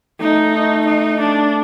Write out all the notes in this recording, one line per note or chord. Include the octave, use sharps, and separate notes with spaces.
A3 D#4
D#4
D4